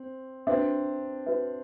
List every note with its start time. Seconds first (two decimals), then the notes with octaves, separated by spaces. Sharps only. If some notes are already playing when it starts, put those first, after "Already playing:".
Already playing: C4
0.47 C4 D4 F#4 B4 E5
1.27 F#4 B4 E5